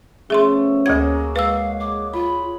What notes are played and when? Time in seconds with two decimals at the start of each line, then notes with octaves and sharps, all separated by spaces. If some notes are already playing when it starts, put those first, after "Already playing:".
0.30 F3 A3 B3 C#4 G#4 E5 C6
0.86 D2 F#3 A#3 G#4 G#6
1.36 G#3 B4 F5 E6
1.80 D6
2.13 F4 B5